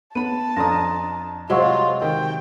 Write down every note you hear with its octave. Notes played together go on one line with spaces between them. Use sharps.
B3 A5 B5 D#7
F2 D4 A#5 C6 D#6 A#6
C3 F#3 G#3 F4 D#5 F#5 C#6
D#3 G5